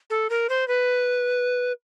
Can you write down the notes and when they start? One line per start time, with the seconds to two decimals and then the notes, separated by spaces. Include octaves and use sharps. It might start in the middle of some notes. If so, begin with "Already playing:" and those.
0.10 A4
0.30 A#4
0.49 C5
0.68 B4